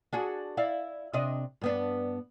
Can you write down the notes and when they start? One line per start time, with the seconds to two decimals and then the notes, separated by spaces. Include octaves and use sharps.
0.13 D4 F#4 G#4
0.57 E4 D5 F5
1.13 C3 D4 D#5
1.61 G2 B3 D4